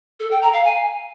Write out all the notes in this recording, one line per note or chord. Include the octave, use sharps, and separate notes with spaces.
A4
G5
A#5
F5
G#5